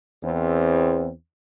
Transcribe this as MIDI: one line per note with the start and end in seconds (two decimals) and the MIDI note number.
0.23 1.10 40
0.23 1.10 60